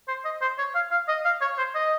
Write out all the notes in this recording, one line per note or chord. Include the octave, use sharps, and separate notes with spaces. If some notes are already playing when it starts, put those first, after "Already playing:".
C5
D#5
C5
C#5
F5
F5
D#5
F5
C#5
C5
D#5